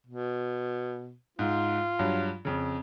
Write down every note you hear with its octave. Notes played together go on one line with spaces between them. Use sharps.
B2
G#2 F4
G2 F#3
F2 C#3